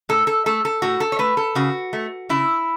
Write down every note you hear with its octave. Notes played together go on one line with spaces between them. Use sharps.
A2 A4
A4
A3 A4
A4
A2 F#4
A4
C#5
A3 B4
A4
C#3 F#4
A3
C#3 E4